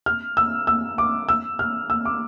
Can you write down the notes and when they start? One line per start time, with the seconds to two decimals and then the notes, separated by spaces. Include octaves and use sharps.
0.06 F6
0.37 E6
0.67 E6
0.98 D6
1.29 E6
1.59 F6
1.90 E6
2.05 D6